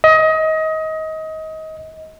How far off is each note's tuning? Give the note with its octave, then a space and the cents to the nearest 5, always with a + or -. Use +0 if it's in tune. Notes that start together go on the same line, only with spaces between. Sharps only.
D#5 +25